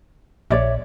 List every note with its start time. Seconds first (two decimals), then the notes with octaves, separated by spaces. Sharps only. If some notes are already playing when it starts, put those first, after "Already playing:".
0.50 A#1 C#5 D5 E5